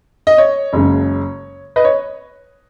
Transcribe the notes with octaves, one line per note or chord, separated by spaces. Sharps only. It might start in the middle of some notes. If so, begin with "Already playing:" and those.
D#5
C#5
F#1 F#2 C#3 G#3
B4 D#5
C#5